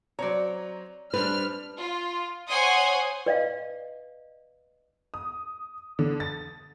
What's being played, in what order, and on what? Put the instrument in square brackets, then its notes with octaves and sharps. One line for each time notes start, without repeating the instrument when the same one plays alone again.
[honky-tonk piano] F#3 C4 A#5 [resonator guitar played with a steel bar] C#5 D5
[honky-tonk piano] G3 C4 D4 [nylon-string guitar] B4 [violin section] F6
[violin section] F4
C5 C#5 F#5 G#5 C6 D#6
[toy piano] B4 D5 D#5 F5
[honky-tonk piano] D#6
D3
A6